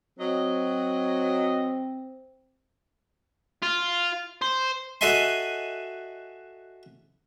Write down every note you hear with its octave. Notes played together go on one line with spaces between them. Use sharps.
F#3 C4 D#5
F4
C5
F#4 A4 D#5 E5 G#5 C6